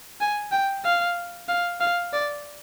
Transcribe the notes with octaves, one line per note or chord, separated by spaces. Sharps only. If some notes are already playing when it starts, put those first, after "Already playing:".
G#5
G5
F5
F5
F5
D5